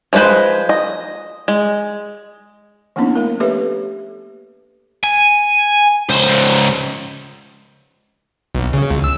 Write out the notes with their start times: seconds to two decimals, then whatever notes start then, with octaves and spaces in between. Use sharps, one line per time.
0.13 F3 G#3 C#4 B4 C5
0.69 D#5
1.48 G#3
2.96 F3 A#3 B3 C#4 D4 E4
3.16 A3 A#4
3.40 G4 A4 B4 C#5 E5
5.04 G#5
6.10 C#2 C5
8.55 B1
8.73 C#3
8.90 C#2
9.04 E6